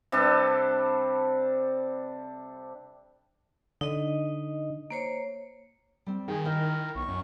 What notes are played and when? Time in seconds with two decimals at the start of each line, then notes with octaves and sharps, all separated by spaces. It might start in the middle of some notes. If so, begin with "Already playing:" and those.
0.12 C3 G3 D4 A4
3.81 D3 D#4 D#5
4.90 A#3 C5 C#5
6.06 G3 C4
6.28 D#3 G3 G#4 G5
6.44 E4 A#4 D#5 G5
6.95 B1 C#6
7.08 F#2